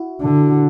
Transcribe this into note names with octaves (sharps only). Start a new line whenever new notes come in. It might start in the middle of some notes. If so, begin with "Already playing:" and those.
Already playing: E4 F#4
D3